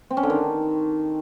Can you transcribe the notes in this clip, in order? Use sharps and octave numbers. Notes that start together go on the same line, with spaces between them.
C4
C#4
D3
D#3